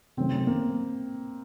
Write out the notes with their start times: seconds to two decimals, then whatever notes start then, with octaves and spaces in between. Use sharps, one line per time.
0.17 C3 D#3 F#3 A3 C4 C#4
0.47 A#3